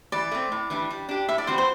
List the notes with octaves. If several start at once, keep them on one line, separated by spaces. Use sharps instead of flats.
E3 D5
A3 C4
A2
E3 G3 D4
G3
D4 G4
A2 E5
D5
E3 G3 C4 F#4 C5
C5